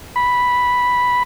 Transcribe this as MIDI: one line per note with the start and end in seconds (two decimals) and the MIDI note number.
0.16 1.23 83